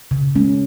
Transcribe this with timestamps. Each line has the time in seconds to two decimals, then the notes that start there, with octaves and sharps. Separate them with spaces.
0.11 C#3
0.35 G#3 C#4